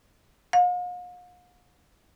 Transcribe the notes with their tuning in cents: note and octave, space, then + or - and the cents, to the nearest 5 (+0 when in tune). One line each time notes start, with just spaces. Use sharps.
F5 +45